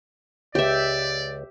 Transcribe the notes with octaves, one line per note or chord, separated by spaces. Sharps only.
C#2 G4 D5 E5